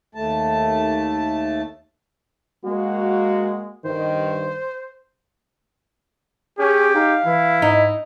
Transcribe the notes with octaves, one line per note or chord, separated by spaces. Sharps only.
D#2 A3 A5
G#3 A#3 F#4
G2 D#3 C5
C#4 G4 G#4
D#4 F5
E3 E4
G#2 D#4